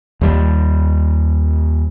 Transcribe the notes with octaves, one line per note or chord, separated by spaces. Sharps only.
D#2 G3